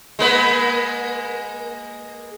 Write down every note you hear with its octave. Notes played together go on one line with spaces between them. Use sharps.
G#3 A#3 B4